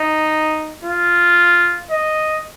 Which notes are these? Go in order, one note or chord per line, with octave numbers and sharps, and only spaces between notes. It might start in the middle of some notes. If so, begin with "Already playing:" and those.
Already playing: D#4
F4
D#5